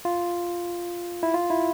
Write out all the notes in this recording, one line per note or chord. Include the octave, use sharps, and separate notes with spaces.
F4
E4
F4
E4